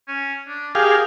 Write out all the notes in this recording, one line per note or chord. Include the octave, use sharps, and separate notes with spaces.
C#4
D4
G4 G#4 A#4 F5